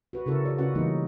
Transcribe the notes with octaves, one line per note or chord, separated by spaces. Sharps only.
F#4 B4
C#3 E4 F#4 A4 A#4
F#4 D5
C#3 C#4 F4 F#4 B4 F#5
E3 G3 G#3 A#3 B3 D#4